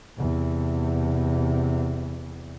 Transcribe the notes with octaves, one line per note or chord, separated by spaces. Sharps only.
E2 C3